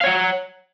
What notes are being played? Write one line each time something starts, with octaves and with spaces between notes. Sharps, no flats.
C#5 F5 F#5